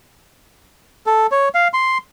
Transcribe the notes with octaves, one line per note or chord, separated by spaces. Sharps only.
A4
C#5
F5
C6